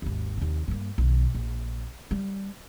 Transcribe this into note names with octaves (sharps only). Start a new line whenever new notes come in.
G#1 D#2
D#2 C3
G2 A#3
B1 D#3
A#1
G3